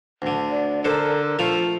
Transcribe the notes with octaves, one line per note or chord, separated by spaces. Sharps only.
D2 D3
D5
D3 A4 A#4 C5
F3 A3 C5 F5